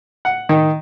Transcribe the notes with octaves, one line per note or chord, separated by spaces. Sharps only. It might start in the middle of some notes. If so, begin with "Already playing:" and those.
F#5
D#3